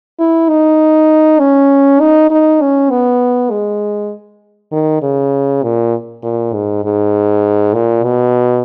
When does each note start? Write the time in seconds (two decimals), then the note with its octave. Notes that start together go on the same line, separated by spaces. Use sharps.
0.20 E4
0.49 D#4
1.39 C#4
2.00 D#4
2.30 D#4
2.61 C#4
2.90 B3
3.51 G#3
4.72 D#3
5.02 C#3
5.63 A#2
6.23 A#2
6.53 G#2
6.84 G#2
7.74 A#2
8.04 B2